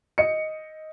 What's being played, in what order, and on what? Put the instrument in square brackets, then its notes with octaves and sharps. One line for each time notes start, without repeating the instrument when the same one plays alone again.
[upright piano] D#5 C#7